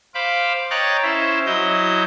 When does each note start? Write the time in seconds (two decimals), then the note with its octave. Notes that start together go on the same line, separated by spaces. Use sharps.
0.15 C5 F5 B5 D6
0.70 C#5 D#5 G5 A#5 F#6 A6
1.03 C#4 E4 C5 E5
1.46 F#3 E4 D#5 G6